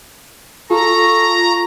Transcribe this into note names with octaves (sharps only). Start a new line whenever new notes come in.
F4 A4 A#5 C#6